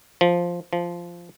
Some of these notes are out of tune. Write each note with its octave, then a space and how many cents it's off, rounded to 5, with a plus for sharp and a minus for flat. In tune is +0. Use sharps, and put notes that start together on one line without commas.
F3 +0
F3 -10